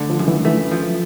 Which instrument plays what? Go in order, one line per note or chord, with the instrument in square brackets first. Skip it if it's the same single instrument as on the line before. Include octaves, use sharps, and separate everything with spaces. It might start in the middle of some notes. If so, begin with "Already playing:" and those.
Already playing: [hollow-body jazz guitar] D3 A3
[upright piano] F3
[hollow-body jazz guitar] F#2
[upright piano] E3
[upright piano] E3 [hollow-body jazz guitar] A3
[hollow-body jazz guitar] F3